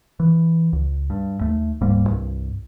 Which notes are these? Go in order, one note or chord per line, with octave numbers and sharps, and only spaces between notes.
E3
C#2
G2
D#2 A3
D1 G#2 G3 A#3
C2 G2